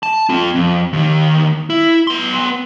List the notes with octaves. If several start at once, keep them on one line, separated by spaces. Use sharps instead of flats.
A5
C4 F4
F2
D#2 D#3
E4
B3 C6